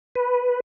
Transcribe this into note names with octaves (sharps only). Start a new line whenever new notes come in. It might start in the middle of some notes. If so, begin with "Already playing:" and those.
B4